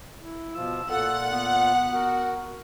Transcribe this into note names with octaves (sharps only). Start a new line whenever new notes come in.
E4
B2 F3 F4 E6
A#2 F4 A4 F#5
B3
F#4 A#4